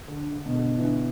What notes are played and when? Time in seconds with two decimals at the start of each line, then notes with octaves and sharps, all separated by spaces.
0.08 D3
0.31 D3
0.46 B2
0.55 D3
0.71 D3
0.78 E3